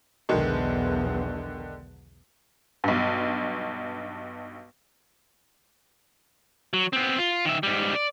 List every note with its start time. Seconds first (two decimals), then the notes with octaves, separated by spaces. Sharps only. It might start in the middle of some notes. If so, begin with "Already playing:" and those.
0.29 B1 E2 D3 D#3 G#3
2.84 B1 G2
6.73 F#3
6.93 B3 C4
7.18 F4
7.45 D#3 E5
7.63 G#2 G3
7.95 D5